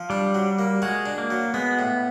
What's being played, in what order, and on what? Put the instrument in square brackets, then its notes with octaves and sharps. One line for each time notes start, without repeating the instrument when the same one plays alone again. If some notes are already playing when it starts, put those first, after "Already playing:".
Already playing: [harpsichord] F3
[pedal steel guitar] G3 [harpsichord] D4
[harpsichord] F#3
A#3
[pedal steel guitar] G#3 [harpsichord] F#4
[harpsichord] D4
[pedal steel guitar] A#3
[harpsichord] F#3
[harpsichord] G#3 [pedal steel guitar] B3
[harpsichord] A2